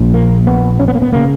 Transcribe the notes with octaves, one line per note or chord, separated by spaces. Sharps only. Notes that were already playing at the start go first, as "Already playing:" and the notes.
Already playing: A#1 A#2
A#3
B3
C#4
B3
A#3
B3
C#3 A#3